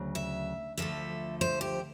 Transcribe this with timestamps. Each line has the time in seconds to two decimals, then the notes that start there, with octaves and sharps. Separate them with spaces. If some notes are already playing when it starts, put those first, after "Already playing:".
Already playing: D2 C#3 F#3
0.15 E5
0.78 D2 D3 F3 A3 E5
1.41 C5
1.61 G4